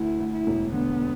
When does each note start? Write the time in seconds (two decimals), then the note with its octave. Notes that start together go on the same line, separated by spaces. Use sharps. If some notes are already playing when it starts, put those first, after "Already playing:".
Already playing: D2 E4
0.20 D2
0.33 E4
0.47 E1
0.73 D3 B3